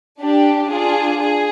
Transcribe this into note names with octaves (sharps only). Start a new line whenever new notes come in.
D4 G4
D4 F4 G#4
G#4